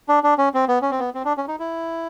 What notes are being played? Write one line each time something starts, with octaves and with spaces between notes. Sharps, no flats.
D4
D4
C#4
C4
B3
C#4
C4
B3
C4
D4
C#4
D#4
E4